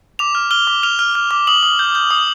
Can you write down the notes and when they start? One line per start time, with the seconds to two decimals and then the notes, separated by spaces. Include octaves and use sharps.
0.19 D6 F7
0.35 F6
0.51 F6 G7
0.67 D6
0.83 F6 F7
0.99 F6
1.15 F6
1.31 D6
1.47 D#6 F#7
1.63 D#6
1.79 G6
1.95 G6
2.11 D#6